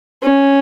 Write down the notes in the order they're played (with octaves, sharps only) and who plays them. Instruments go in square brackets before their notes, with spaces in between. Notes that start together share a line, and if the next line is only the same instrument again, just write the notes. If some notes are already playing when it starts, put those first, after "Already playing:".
[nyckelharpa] C#4